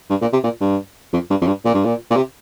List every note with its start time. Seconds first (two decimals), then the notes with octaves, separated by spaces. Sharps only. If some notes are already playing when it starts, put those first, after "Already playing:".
0.10 G2
0.21 A#2
0.33 C3
0.44 A#2
0.61 G2
1.13 F2
1.30 G2
1.41 F2
1.47 G2
1.65 A#2
1.74 G2
1.85 A#2
2.11 A#2
2.16 C3